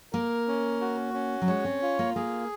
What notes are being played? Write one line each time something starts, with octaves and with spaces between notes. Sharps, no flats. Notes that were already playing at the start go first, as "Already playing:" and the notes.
A#3 A#4
C#4
F#4
C#4
F#3
G#3 C#5
C4
F4
A#3
A#3 G#4